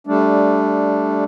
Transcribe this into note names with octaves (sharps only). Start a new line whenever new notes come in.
G3 A3 D4